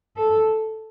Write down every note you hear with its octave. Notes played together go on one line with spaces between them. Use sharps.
A4